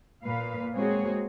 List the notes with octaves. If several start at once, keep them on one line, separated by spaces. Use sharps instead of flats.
A#2 B4 F5
G#3 A#3 C4 F#4 G#4 C#5